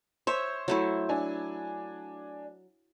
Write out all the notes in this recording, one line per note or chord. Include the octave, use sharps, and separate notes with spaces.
C5 C#5 E5
F#3 A3 E4
D4 G#5